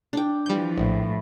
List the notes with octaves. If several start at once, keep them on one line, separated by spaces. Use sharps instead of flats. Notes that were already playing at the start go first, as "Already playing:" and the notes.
D4 G5
E3 F3 G3 G6
A#1 A2